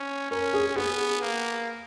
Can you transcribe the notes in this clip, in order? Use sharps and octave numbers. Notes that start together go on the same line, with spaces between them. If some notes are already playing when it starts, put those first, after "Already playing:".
Already playing: C#4
C#4 A#4
G#4
B3 G#4
A#3